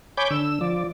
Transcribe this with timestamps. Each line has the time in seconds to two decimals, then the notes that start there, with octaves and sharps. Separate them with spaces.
0.17 C#5 G#5 B5 D6 G6
0.31 D3 E6
0.61 F3 D5